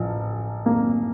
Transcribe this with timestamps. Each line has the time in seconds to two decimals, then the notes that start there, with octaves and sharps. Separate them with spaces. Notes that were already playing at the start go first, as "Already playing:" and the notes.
Already playing: A1 F3
0.66 A#3